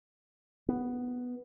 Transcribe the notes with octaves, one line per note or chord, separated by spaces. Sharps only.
B3